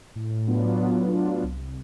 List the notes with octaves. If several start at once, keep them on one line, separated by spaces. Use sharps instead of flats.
A2
F#3 B3 D4 F4
A2
F#3 B3 D4 F4
C2